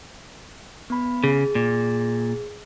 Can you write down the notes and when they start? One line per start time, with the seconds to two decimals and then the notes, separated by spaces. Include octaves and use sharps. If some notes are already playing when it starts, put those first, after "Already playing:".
0.90 B3 B5
1.24 C#3 G#4
1.55 A#2